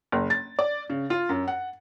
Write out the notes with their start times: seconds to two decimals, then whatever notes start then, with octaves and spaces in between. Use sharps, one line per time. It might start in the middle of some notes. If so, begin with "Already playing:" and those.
0.12 F#1
0.30 A6
0.59 D5
0.90 C#3
1.10 F4
1.29 F#2
1.48 F#5